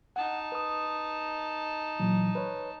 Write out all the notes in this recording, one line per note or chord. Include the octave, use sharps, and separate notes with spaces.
D#4 F#5 A5
B4 D#6
A#2 E3 F#3
B4 C#5